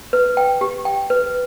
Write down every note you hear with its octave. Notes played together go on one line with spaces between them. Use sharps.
B4
G5
G4
G5
B4